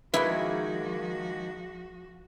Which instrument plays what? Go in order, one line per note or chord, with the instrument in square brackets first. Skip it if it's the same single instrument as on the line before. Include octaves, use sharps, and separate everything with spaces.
[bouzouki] D#3 G#3 A#3 [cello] F3 F#4 [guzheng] E4 [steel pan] B4